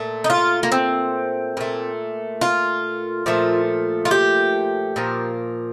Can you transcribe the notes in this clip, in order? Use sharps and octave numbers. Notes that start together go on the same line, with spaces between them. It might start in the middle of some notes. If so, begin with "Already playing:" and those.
Already playing: A#2 A3
D#4
F4
A#3
C4
A#2 A3
F4
A#2 F3 A3
F4
G4
A#2 F3 A#3